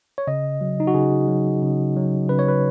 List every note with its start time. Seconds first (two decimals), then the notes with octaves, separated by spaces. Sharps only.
0.18 C#5
0.27 C#3 D#5
0.61 F#3
0.80 D#4
0.87 F#4
0.94 C#3 G#4
1.28 F#3
1.62 C#3
1.96 F#3
2.29 C#3 B4
2.39 C#5
2.48 B4